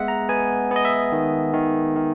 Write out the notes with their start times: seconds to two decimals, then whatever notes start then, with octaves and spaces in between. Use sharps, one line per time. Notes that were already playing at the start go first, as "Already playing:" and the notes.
Already playing: G#3 B3 D#5 E5 F#5
0.08 A#5
0.29 B3 G#5
0.71 B3
0.76 D#5
0.85 E5
1.12 D#3
1.53 D#3
1.96 D#3